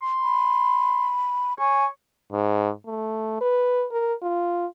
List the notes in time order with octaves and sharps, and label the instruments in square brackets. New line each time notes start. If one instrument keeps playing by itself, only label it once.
[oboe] C6
[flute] B5
[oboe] C#5 [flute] G#5
[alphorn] G#2
A3
B4
A#4
F4